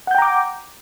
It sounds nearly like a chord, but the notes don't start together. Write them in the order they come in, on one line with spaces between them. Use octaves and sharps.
F#5 G6 G5 A#5 D6